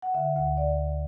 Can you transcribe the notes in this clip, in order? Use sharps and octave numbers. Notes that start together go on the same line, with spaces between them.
F#5
D3 E5
D2 F#5
D5